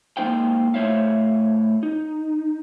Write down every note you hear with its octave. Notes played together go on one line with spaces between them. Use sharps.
G#3 A#3 D#4 C5 F5 G5
A2 E4 C5 C#5 E5 F5
D#4